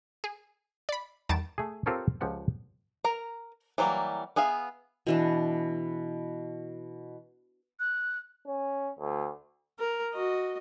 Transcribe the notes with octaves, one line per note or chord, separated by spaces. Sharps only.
G#4
D5 B5
E2 D#3 G3 A5 D7 E7
A3 G#4
C4 F4 G4 A4 A#4 C#5
C#2 F3 G4 F#5 A5
A#4 A#5
E3 F#3 G3 A#3
B3 G#4 E5 F5
B2 E3 D4
F#6
C#4
D2
A#4
F#4 D#5